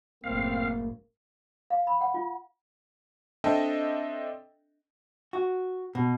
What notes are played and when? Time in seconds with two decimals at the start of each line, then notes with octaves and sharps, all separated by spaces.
0.24 F#1 A2 A#3 C4 F5
1.70 F5
1.87 B5
2.01 F#5
2.14 F4
3.44 C4 D4 A4 D#5 E5 G5
5.33 F#4
5.95 B2